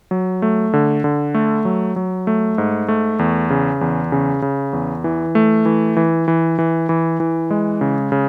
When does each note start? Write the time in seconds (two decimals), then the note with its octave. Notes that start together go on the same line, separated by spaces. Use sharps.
0.11 F#3
0.42 A3
0.73 D3
1.04 D3
1.34 A3
1.65 F#3
1.96 F#3
2.27 A3
2.58 G#2
2.88 A3
3.19 E2
3.50 C#3
3.81 E2
4.12 C#3
4.42 C#3
4.73 E2
5.04 E3
5.35 A3
5.65 E3
5.97 E3
6.28 E3
6.59 E3
6.89 E3
7.20 E3
7.51 G#3
7.81 C#3
8.12 C#3